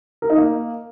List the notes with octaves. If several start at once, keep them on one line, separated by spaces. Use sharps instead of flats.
A#4
D#4
A#3